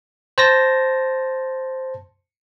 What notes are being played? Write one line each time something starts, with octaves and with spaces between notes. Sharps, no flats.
C5 A5 A#6